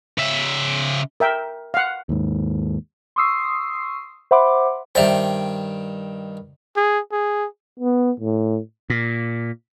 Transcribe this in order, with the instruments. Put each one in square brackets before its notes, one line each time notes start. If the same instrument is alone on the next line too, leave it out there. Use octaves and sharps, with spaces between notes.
[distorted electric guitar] C#3 E5
[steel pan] A#4 E5 G5
F5 F#5
[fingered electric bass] D#2 G#2
[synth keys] C6 C#6 D#6 E6 C7
C5 E5 F#5 B5 C6 D6
[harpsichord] G2 D#3 G5 [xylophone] C5 D5 E5
[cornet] G#4
G#4
[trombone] B3
A2
[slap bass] A#2